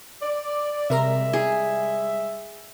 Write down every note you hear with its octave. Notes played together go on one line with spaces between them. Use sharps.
D5
C3 G3 G#3 A#4 E5 A#5
G#4